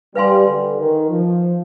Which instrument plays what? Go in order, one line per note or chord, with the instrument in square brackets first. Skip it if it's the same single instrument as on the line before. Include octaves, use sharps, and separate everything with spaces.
[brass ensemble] G3 [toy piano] B4 F5 G#5 C6
[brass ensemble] D3
D#3
F3